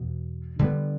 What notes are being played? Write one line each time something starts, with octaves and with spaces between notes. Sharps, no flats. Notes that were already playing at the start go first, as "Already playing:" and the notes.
Already playing: E2 B2
D3 G3 B3